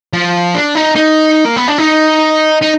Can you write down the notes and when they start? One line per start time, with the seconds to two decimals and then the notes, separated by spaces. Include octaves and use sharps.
0.13 F3
0.54 D4
0.75 D#4
0.96 D#4
1.45 A#3
1.57 B3
1.68 D4
1.78 D#4
2.62 D#4